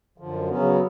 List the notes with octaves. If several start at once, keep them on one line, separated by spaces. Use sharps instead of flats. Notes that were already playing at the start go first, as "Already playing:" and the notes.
F#2 D3 F3
C#3 F#3 B3 C#4